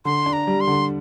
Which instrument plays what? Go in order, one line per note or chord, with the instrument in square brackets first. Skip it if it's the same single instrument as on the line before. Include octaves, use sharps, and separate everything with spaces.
[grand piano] D3 [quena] C6
[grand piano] D4
[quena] A#5
[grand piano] G3
[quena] C6
[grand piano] D3